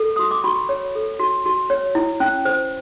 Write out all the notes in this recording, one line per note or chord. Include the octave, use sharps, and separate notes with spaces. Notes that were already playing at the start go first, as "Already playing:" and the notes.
Already playing: A4
F#4 D#6
D6
F#4 B5 C#6
C#5
A4
F#4
F#4
C#5
E4
C#4
C5